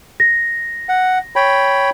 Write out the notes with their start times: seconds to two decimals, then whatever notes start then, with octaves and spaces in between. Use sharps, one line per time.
0.20 A#6
0.89 F#5
1.36 C#5 G5 B5